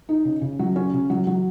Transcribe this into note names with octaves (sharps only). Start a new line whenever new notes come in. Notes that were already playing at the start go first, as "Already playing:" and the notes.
D#4
C#3
C#3
F#3
C#4
C#3
F#3
F#3